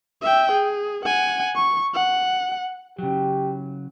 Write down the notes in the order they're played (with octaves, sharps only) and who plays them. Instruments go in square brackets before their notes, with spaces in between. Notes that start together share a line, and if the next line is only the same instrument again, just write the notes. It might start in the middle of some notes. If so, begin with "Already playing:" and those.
[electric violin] E5 G5
G#4
F#5 G#5
C#6
F#5
[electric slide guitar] C#3 F#3 [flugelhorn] G4